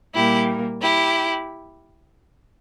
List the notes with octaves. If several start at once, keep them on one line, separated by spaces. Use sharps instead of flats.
A#2 G3 A#3 E4 G4
E4 G4